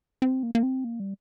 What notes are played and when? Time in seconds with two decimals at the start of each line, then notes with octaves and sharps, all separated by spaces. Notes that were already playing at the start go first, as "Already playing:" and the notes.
0.22 C4
0.43 A#3
0.55 A#3
0.63 C4
0.84 A#3
1.00 G3